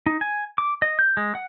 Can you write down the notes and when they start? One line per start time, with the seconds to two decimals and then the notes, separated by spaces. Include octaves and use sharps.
0.06 D#4
0.21 G#5
0.58 D6
0.82 D#5
0.99 G6
1.17 G#3
1.35 F#5